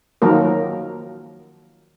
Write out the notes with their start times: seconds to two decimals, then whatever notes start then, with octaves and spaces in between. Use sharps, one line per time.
0.22 D#3 F3 F#3 A#3 A#4